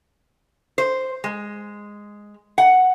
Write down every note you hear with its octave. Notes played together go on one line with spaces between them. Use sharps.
C5
G#3
F#5